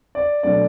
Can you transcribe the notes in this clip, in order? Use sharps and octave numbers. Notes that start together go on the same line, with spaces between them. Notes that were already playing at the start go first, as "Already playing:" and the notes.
D5
B2 F#3 A3 D4 D5